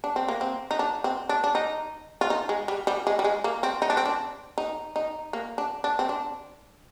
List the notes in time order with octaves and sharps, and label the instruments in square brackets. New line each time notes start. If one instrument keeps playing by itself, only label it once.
[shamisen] D4
C4
A#3
C4
D#4
D4
C4
D4
D4
D#4
F4
D#4
G#3
G3
G3
G#3
G3
G#3
A#3
C4
D#4
D4
C4
D4
D#4
D#4
A#3
D4
D4
C4
D4